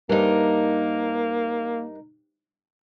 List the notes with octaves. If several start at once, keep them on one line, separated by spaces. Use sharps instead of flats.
G2 C3 G3 A#3 D#4 A#4